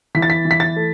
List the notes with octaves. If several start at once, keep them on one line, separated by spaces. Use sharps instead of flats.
E3 B6
A6
B6
E3
B6
A6
A3